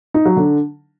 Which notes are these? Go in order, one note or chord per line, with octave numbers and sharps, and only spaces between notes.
D#4
F#3
D3